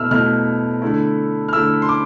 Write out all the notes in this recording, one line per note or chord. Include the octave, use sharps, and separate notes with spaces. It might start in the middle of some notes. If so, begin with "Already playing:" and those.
Already playing: B2 A3 E4 E6 F6
B2 A3 E4 F6
D3 A3 E4
F6
D3 A3 E4 E6
C6
D6